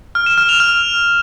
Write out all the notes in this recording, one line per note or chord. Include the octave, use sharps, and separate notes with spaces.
F6
E7
F6
F7
F6